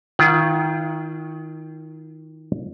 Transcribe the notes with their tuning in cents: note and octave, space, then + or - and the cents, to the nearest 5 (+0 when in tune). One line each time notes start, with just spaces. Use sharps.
D#3 +20 F4 -35 F#5 +0